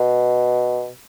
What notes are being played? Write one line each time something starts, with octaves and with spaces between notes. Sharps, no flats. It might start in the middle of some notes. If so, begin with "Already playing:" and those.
Already playing: B2